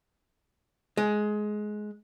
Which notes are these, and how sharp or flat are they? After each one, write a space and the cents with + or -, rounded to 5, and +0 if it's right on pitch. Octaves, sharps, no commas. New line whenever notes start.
G#3 +15